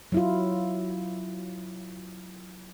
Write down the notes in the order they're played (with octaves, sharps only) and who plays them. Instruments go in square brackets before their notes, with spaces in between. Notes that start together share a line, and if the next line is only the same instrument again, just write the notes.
[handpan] F#3 E4 F4